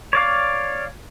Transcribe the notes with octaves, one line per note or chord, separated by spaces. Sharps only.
C#5 D5 F5